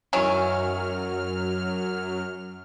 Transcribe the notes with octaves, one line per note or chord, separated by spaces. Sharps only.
F#2 D#3 E3 F#3 C#4 F6